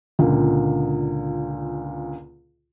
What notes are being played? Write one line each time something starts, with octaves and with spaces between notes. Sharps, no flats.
C#2 A#2 D3